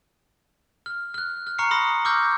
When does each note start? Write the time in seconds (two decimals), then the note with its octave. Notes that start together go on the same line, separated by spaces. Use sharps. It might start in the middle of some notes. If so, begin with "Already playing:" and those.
0.86 F6
1.14 F6 F#6
1.47 F6
1.58 A#5 C#6 F6 C7 C#7
1.71 B5 C6 D#6 A#6
2.05 C#6 D6 E6 F6 G6 A#6